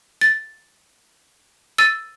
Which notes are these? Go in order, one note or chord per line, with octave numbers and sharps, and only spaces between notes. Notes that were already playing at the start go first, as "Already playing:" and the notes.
A6
E6 A6 D#7